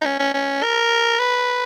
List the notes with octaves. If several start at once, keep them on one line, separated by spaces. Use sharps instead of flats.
D#4
C#4
C#4
C#4
A#4
B4